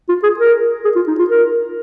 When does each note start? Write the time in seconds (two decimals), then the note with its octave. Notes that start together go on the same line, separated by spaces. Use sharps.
0.09 F4
0.24 G#4
0.39 A#4
0.85 G#4
0.96 F4
1.08 D#4
1.19 F4
1.30 A#4